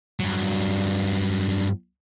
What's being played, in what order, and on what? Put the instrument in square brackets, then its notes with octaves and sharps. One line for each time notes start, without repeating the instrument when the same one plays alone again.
[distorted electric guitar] G2 F#3